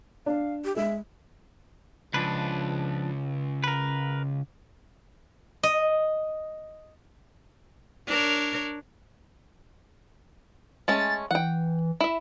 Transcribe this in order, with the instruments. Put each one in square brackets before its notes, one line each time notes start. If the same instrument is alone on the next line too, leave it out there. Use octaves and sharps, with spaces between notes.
[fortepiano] D4 [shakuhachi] F5
[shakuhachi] G4
[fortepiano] G#3 [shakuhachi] E5
[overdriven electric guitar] C#2 [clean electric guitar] F3 D4 B4
[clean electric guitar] A#4 B4
[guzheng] D#5
[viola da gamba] D4 A#4 C#5
[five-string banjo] G#3 A3 C#4 [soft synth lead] A6
[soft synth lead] E3 [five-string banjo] F#5 G5
[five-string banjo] E4 E5